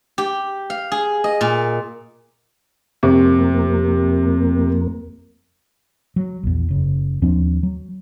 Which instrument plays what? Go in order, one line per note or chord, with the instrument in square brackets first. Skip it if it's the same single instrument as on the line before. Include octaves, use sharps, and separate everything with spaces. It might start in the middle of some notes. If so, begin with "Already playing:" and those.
[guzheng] G4
F5
G#4
D#5
A#2
[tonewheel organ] F2 A#3 [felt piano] C3
[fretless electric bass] F#3
A#1 E2
F#1 C#3
D#2 F3 C4 D4
F#3